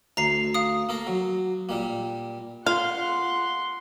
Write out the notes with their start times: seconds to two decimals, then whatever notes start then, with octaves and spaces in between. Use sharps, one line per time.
0.17 D2 A#5 C7
0.54 F5 D#6
0.89 A#3 A4 A#4
1.07 F#3
1.69 A#2 G3 A#3
2.66 F4 F5 F#5 C6